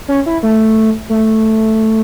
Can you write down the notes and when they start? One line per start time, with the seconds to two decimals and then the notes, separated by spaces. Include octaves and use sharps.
0.08 C#4
0.26 E4
0.43 A3
1.09 A3